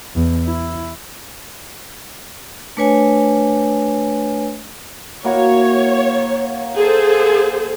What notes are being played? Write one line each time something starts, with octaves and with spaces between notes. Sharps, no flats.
E2
E4
A3 D4 B4 C#5 G#5
A#3 E4 F#4 C#5
G#4 A4 C5